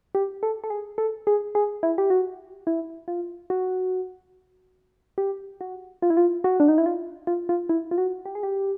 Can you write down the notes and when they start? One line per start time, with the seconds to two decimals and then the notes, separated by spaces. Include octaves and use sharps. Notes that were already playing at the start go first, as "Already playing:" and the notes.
0.15 G4
0.43 A4
0.64 A4
0.70 G#4
0.98 A4
1.27 G#4
1.55 G#4
1.83 E4
1.98 G4
2.10 F#4
2.67 E4
3.08 F4
3.50 F#4
5.18 G4
5.61 F#4
6.02 F4
6.10 E4
6.17 F4
6.44 F#4
6.60 D4
6.68 D#4
6.78 E4
6.86 F4
7.27 F4
7.49 F4
7.69 E4
7.91 F4
7.98 F#4
8.26 G4
8.35 G#4
8.43 G4